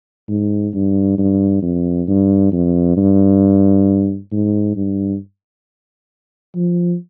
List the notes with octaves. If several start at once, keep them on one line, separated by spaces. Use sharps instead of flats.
G#2
G2
G2
F2
G2
F2
G2
G#2
G2
F3